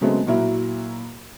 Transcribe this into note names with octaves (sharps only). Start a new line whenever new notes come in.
C#3 F#3 G#3 A3 B3 C4
A#2 F#3 A#3 E4 F#4